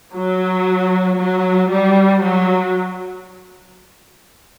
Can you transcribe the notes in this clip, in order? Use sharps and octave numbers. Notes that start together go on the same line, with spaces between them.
F#3
F#3
G3
F#3